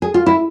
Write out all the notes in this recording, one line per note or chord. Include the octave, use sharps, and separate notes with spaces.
G#4
F4
E4